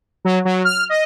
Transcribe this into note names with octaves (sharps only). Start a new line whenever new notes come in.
F#3
F#3
F6
D#5